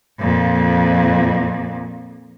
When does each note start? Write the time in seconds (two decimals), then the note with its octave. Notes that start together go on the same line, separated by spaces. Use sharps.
0.19 F2 A#2